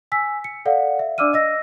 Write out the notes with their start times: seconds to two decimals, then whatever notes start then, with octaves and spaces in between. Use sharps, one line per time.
0.12 G#5 E6 B6
0.44 C#7
0.65 A4 D5 F5 F#5
0.99 E5
1.18 D4 D5 D6 E6 F6 D#7
1.33 D#5 E6 A#6